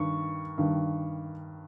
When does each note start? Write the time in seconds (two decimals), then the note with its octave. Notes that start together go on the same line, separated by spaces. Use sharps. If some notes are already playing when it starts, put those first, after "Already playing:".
Already playing: G2 D#3 C#6
0.58 G2 D#3